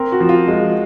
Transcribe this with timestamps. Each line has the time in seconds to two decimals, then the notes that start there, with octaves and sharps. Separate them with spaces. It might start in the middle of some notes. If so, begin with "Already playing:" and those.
Already playing: C4 A#4
0.12 F#4
0.20 F3
0.29 F4
0.48 G#3